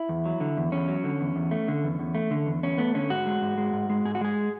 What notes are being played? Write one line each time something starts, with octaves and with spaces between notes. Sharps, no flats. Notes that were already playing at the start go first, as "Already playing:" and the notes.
Already playing: E4
E2
F#3
D3
E2
E2 C#4
F#3
D3
E2
E2
A3
D3
E2
E2
A3
D3
E2
E2 C#4
A3 B3
D3 C#4
G#2 F#4
G#3
G#2
G#3
G#2
G#3
G#2 G#4
F#4
G#3 G#4